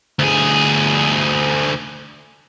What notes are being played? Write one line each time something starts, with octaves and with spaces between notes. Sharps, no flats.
D2 G#4